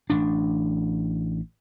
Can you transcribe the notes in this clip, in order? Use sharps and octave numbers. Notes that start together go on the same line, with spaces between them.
A1 D4